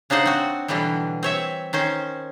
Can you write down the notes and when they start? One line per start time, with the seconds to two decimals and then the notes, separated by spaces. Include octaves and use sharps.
0.10 C#3 D4 D#4 C5 F#5
0.26 C4 F#4
0.68 B2 D3 E3 F#3 G3
1.23 C4 C#5 E5
1.73 D#3 C#4 C5